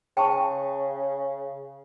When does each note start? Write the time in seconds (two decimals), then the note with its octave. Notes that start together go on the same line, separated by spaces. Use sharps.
0.17 C#3 G5 A5 C#6